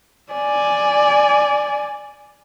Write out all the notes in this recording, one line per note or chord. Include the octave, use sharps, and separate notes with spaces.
D5 G#5